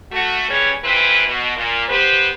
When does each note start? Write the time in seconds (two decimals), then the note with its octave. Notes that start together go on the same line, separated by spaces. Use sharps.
0.12 A3 F#4
0.49 G3 C#4 G#4 B4 C#5
0.84 F2 E3 C4 G4 B4
1.26 B2
1.56 A#2
1.89 B3 G4 B4 C5